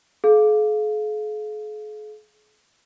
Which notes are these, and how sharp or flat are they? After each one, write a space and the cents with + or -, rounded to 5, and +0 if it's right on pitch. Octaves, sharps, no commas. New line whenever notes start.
G#4 +45 F5 +0